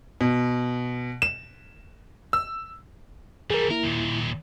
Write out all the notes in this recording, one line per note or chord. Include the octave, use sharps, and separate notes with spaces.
B2
E7
E6
E3 G3 G#4 A#4
A#3 E4 A#4
D#2 A#2